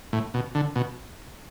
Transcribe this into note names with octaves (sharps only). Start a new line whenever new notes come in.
A2
B2
D3
B2